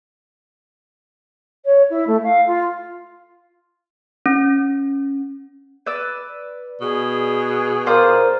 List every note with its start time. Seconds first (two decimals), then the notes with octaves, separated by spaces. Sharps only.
1.65 C#5
1.90 E4
2.07 A3
2.23 F5
2.47 F4
4.26 C#4
5.86 B4 D5 E6
6.81 B2 G#4
7.86 F4 A#4 C5 D5